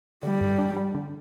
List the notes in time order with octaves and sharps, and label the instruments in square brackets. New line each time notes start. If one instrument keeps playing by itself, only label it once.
[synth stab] D3 [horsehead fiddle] G3
[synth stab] G2
D4
G3
D3